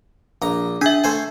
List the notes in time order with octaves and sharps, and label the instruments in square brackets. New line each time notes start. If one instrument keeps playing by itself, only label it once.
[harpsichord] A#1 A#5
[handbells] D4 E5 [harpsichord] G#4
[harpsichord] A3 C5 G#5